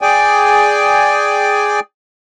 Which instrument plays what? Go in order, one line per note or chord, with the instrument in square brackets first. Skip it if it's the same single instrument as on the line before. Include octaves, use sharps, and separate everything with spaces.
[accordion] G#4 D5 G5 G#5